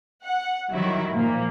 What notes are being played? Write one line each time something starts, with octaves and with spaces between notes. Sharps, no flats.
F#5
D#3 F#3 G3 E4
A#2 F3 A#3